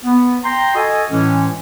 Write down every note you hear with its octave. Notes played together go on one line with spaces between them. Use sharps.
B3
G5 A#5 C6
F#4 A4 D#5 G#5
A2 E3 G#3 C#4